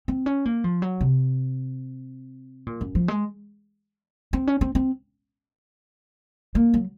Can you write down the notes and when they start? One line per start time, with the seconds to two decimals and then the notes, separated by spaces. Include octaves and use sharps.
0.08 C4
0.26 C#4
0.46 A#3
0.64 F3
0.82 F#3
1.01 C3
2.67 A#2
2.81 F#2
2.95 F3
3.08 G#3
4.33 C4
4.47 C#4
4.61 C4
4.75 C4
6.55 A#3
6.74 F#3